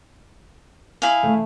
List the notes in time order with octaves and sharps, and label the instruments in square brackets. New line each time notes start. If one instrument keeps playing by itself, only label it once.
[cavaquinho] E4 G#4 F5
[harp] A3